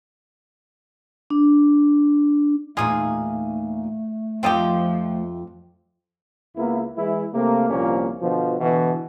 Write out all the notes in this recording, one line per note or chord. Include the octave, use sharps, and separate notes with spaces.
D4
E2 A#2 A3 D#4 F4 G#4
F2 F3 C4 D#4 F4 G4
C#2 A#3 B3 E4
E3 G#3 E4
C3 A3 A#3
C2 A#2 F3 A#3 C#4
B2 D3 F3
B2 D3 E3